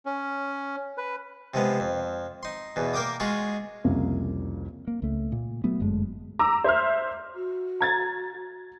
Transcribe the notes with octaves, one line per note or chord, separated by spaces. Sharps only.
C#4
B4
C3 F3 G#3 B3
F2
D#4 C6
E2 B2
A#3 A#4 G5 D6 D#6
G#3 F4 F#4 G#4
C2 F2 C#3 A#3
A#3
C#2 A3
A#2
F#3 A3 B3
G1 F#2 G#3 A3
A#5 D6 E6
C5 E5 C6 F6
F#4
A#5 G#6 A6